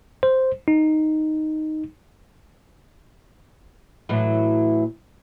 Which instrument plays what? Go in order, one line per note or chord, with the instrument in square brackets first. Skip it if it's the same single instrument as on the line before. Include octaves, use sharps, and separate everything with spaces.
[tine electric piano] C5
D#4
[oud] A2 E3 F#3